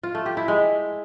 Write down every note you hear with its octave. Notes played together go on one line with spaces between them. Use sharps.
F4
A3
G4
E4
G#3